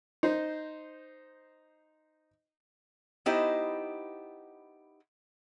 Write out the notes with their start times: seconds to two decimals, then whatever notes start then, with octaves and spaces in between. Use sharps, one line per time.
0.23 D#4 C5
3.26 B3 D#4 E4 G4 C5 D#5